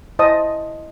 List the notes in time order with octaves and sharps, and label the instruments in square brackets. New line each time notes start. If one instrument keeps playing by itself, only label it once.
[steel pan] E4 C5 D#5 A5 D#6